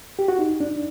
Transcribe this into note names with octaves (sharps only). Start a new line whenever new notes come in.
G4
F#4
D#4
D4